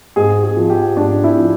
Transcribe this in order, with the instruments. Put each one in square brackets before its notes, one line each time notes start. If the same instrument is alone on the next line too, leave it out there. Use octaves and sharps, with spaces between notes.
[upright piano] G#2 G#4
G#4
F3
G4
G#2 D4
E4
F3